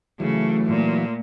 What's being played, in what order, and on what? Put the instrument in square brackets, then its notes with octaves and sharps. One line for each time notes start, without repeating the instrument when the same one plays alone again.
[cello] C#3 [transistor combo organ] E3 F#3 [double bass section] A3
[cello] A#2